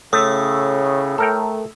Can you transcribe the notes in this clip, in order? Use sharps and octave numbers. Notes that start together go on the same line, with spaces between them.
A2 C#3 A3 D#6 E6
A3 A4 A#4 G5